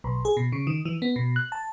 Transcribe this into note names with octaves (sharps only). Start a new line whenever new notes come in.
B1
G#4
B2
C#3
D#3
E3
B3
B2
F#6
A5